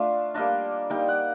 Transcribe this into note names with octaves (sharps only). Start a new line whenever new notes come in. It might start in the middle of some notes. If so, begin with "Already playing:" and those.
Already playing: A3 D4 F4 F5
G3 A#3 D4 D#5
G3 A#3 D#4 G5
F#5